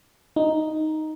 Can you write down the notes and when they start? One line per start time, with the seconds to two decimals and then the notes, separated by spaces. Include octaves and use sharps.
0.36 D#4